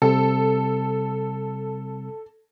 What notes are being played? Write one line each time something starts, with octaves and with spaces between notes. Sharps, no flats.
C3 G3 C4 A4